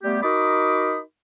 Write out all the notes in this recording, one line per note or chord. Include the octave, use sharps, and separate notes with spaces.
G3 A3 B3 G4
D#4 F#4 A#4 B5 D6 D#6